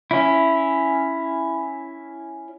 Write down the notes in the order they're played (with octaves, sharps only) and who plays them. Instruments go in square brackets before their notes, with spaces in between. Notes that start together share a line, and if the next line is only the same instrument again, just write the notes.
[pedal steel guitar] C#4 E4